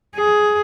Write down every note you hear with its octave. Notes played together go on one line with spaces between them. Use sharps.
G#4